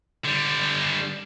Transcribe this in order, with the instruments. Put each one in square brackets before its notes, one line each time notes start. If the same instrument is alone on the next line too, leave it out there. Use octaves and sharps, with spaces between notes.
[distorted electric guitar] D3 G3